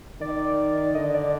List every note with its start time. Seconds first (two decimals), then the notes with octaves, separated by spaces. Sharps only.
0.20 D#3 D5
0.95 D3 D#5
1.14 D5